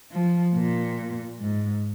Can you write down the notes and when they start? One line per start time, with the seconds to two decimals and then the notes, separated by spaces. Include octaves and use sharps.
0.12 F3
0.55 A#2
1.40 G#2